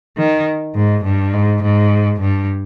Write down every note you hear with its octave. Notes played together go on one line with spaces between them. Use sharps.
D#3
G#2
G2
G#2
G#2
G2